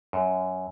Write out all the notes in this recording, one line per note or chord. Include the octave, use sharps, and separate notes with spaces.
F#2